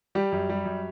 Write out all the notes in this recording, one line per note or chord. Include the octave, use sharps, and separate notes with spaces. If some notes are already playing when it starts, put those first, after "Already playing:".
G3 G4
F#2
G3
F#2